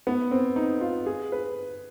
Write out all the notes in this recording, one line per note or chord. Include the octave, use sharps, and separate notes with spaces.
B3
C4
D#4
F4
G#4
B4